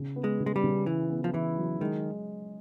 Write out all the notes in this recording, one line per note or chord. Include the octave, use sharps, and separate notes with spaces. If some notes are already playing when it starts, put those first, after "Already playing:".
Already playing: C#3
B3
G#3
C#3
G#3
G3
C#3
E3 E4
B3
F3
E3 E4
F#3
D#3 G#3